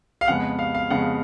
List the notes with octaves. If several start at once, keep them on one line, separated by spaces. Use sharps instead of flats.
F5
F2 C#3 G#3 B3 F#5
F5
F5
F2 C#3 G#3 B3 F#5